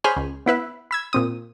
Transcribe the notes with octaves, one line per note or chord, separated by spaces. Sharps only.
G#4 C5 C#5 G#5 B5 F6
C#2
B3 E4 B4 E5
B5 E6 G#6
A#2 C4 D#6